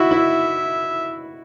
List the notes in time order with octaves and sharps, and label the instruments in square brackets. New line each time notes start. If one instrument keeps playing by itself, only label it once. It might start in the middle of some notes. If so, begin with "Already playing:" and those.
Already playing: [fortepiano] E4 F#4 [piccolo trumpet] E5
[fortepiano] E4